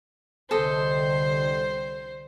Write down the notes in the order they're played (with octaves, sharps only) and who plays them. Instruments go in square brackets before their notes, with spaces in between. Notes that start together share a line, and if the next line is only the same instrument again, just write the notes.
[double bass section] C2 D3 G3 [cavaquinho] A4 D#5 [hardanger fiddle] C5